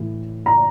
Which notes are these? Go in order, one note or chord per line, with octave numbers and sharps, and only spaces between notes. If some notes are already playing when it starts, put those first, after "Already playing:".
Already playing: A2 E3
A#5